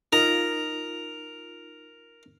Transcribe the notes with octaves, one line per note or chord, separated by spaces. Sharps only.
D#4 F4 A#4 A#5